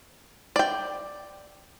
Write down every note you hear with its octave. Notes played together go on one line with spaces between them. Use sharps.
D5 G5